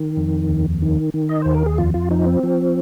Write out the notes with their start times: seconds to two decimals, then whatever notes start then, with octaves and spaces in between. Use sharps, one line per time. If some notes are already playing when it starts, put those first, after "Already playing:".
Already playing: D#3
0.17 F2
0.49 D#2
0.82 D#3
1.14 D#3
1.29 D#5
1.42 D#2 C5
1.54 A#4
1.66 G#4
1.78 F2 F4
1.94 F4
2.11 F3 D#4
2.26 C4
2.43 F3